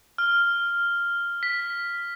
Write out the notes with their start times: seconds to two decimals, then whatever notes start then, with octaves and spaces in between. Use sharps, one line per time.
0.18 F6
1.43 B6